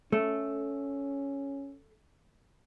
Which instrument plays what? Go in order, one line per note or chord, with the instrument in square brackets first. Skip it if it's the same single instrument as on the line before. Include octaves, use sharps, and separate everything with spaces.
[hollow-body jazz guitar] A3 [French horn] C#4